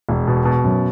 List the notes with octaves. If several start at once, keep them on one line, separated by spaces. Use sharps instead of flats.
E1
B2
B2
F#2